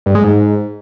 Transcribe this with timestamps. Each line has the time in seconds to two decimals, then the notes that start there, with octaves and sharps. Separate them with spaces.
0.06 G2
0.15 G#3
0.24 G#2